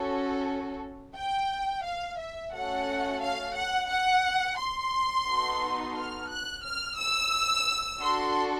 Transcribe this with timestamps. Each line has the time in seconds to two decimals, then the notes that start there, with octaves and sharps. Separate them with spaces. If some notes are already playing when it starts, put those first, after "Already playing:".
Already playing: C#4 F#4 A4
1.16 G5
1.85 F5
2.20 E5
2.53 A3 C#4 F#4 A4 F#5
3.22 F5
3.56 F#5
3.90 F#5
4.58 C6
5.27 B3 D#4 F#4 A4
5.96 F6
6.30 F#6
6.64 F6
6.98 E6
8.01 D4 F#4 A4 C6